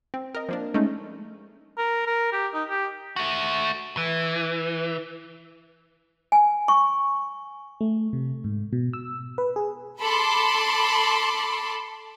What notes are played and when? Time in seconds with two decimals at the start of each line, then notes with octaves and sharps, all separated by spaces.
0.14 C4
0.35 A#4 D#5
0.49 F3 A#3 D4
0.74 G#3 A3 C#4 D#4
1.78 A#4
2.06 A#4
2.32 G4
2.54 D#4
2.70 G4
3.16 A3 F#4
3.97 E3
6.32 G#5
6.68 C#6
7.81 A3
8.13 C3
8.44 G#2
8.73 B2
8.93 E6
9.38 B4
9.56 G#4
10.00 A4 A5 B5 C6 D6